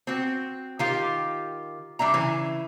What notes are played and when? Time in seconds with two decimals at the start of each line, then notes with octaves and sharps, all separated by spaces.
0.07 C4 F#4
0.79 D#3 F4 G4
1.99 G3 D4 E5 A#5
2.14 C#3 E3